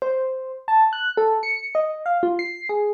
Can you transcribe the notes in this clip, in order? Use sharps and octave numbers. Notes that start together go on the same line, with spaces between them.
C5
A5
F#6
A4
C#7
D#5
F5
F4
C7
G#4